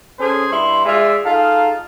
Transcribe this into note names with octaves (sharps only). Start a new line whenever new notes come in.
C#4 G#4 A4 C5
G2 E4 C6
G#3 F4 D5 E5
D#4 F4 G#4 A4 F5